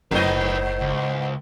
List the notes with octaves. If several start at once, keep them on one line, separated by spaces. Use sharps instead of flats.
F#1 G#2 D#4 B4 C5 D#5
C#2